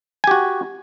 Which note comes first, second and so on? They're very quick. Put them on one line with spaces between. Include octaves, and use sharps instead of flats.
G#5 G4 F#4